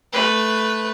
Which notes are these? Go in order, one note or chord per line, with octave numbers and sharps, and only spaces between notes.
A3 B4